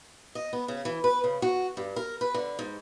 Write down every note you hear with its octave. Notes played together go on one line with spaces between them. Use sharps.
D#5
B3
C#3
E3
B4
C#3
F#4
G2
A#4
B4
D3
G#2